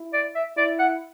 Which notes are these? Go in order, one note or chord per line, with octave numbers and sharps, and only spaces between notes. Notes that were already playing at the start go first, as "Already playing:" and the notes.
Already playing: E4
D5
E5
E4 D5
F#5